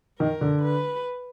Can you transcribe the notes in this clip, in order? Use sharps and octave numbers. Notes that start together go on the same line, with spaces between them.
D#3 A#4
D3
B4